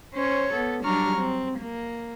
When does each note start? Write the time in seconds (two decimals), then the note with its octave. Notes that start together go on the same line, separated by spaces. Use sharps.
0.14 C#4 C5 C#5
0.53 B3 A4
0.83 F#3 G3 D4 A#5 C#6 F6
1.19 C4
1.60 A#3